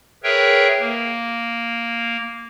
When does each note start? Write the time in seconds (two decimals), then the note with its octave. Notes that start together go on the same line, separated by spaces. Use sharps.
0.23 G#4 A#4 B4 C#5 E5 G5
0.79 A#3